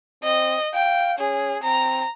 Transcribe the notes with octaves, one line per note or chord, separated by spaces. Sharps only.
C4 D#5
F5 G5
C#4 G#4
C4 A#5